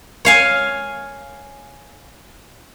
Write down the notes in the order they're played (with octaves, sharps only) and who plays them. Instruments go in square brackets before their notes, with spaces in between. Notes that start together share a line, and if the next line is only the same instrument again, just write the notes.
[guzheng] C#5 F5 G#5